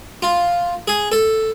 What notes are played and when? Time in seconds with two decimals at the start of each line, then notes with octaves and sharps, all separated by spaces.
0.22 F4
0.88 G#4
1.12 A4